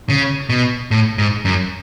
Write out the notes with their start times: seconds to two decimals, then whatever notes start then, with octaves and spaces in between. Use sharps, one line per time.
0.09 C#3
0.49 B2
0.91 A2
1.18 G#2
1.45 F#2